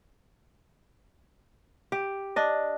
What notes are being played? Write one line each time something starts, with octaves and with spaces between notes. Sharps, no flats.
G4
D4 D#5